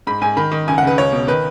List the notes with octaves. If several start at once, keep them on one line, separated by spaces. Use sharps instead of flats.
G#2 B5
G#2 G#5
D#3 B5
D#3
C#2 G#5
F#5
C#3 B4
C#2 C#5
B2
D#3 B4